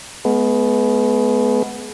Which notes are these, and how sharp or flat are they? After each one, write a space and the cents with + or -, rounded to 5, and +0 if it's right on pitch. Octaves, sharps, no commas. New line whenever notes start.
G#3 +40 B3 +0